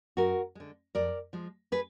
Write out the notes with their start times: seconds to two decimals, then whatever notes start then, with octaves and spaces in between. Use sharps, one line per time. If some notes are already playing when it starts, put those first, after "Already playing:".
0.17 F#2 F#4 A#4
0.55 D3 G#3
0.95 F2 A#4 D5
1.33 F3 G#3
1.72 G#4 B4